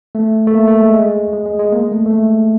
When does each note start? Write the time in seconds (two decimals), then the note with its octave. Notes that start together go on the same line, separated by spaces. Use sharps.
0.15 A3
0.47 A3
0.54 A#3
0.67 A3
0.81 G#3
0.93 G#3
1.33 G#3
1.46 G#3
1.59 G#3
1.72 A#3
1.92 A3
2.06 A3
2.11 G#3